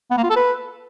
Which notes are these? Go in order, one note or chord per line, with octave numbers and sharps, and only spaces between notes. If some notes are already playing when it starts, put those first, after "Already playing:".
B3
A#3
F4
A4
B4